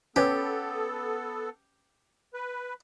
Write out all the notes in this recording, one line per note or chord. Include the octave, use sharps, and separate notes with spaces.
B3 C#4 G4 A4 B4 C#5
B4